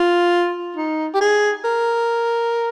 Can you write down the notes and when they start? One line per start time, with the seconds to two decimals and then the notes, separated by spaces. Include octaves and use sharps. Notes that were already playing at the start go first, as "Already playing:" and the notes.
Already playing: F4
0.77 D#4
1.14 G4
1.21 G#4
1.65 A#4